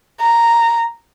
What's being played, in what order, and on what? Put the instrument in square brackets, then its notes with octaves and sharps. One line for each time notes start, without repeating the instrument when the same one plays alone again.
[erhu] A#5